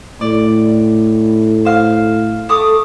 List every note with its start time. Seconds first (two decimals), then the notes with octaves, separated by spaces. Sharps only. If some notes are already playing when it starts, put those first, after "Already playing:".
0.21 A2 D5
1.65 C5 F5
2.49 A3 D6 D#6